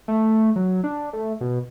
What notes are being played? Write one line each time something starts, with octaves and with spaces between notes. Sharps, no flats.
A3
F#3
D4
A3
B2